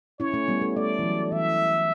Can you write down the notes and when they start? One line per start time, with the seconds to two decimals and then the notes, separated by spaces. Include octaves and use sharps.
0.20 C#4 E4 C#5
0.34 A3 C#4
0.48 G3 B3
0.62 A3
0.76 A3 D5
0.99 E3
1.03 F#3
1.32 E3 E5